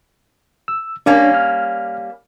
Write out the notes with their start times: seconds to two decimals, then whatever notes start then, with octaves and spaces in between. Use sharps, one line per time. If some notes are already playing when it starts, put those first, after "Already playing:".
0.68 E6
1.06 G3 A#3 C#4 D4 C#5 D5
1.34 F6